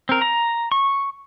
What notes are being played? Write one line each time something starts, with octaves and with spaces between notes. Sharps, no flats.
C4 A#4
A#5
C#6